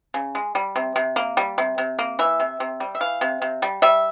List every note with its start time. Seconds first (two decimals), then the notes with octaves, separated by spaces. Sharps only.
0.14 C#3
0.35 G#3
0.55 G3
0.76 C3
0.96 C3
1.16 A#3
1.37 G3
1.58 C3
1.78 C3
1.99 A#3
2.19 E3 E5
2.40 C3
2.60 C3
2.80 G3
2.95 E5
3.00 E3 F5
3.21 C3
3.42 C3
3.62 G3
3.82 G3 E5